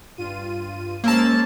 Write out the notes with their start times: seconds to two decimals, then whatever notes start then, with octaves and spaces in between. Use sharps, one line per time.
0.17 G2 F4 D#7
1.04 G#3 A#3 C#4 C5 A5 E6